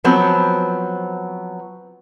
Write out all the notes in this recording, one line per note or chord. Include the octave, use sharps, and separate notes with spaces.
F3 F#3 B3 C4